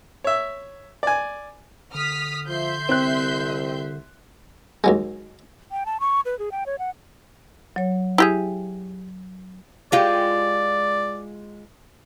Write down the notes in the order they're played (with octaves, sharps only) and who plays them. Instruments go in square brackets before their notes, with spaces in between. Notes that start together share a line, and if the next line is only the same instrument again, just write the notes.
[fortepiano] C#5 E5
D5 G#5
[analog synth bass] D3 [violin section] D#6 F6 B6
[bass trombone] F3 [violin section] E5 C6 G6
[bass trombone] C2 [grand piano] C4 F#6
[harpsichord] D#2 F#3 G#3
[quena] G5
A5
C#6
B4
G#4
G5
C#5
F#5
[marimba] F#3 C#5
[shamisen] E4 G4 G#4
[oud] G#3 F4 G4 [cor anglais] D5